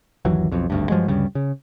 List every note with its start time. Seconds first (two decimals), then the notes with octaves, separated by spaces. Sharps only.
0.25 G1 D#2 E3 F#3
0.52 B1 F2
0.70 G#1 D2 G2
0.90 G2 F3 F#3 G#3
1.08 D2 G2 C#3 G3
1.35 C#3